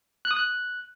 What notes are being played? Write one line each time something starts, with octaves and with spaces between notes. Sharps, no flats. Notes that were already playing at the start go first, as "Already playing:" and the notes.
F#6
D#6
F#6